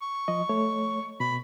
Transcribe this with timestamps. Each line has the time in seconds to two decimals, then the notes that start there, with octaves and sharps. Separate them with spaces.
0.02 C#6
0.28 F3 D#5
0.49 A3 C#5
1.20 B2 B5